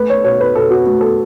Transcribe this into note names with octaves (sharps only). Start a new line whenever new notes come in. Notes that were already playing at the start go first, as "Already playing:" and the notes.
Already playing: A3 B4
C#5
B2 C#5
B4
B2 A4
F#4
A3 F#4
A4